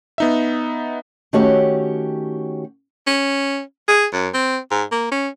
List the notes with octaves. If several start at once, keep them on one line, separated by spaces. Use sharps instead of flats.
B3 D#4 E5
D#3 A3 C#4 F#4 G4 C#5
C#4
G#4
F#2
C4
G#2
A#3
C#4